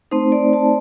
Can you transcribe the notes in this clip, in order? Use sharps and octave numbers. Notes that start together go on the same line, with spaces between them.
A3 C4 D#4 C5
D5
A5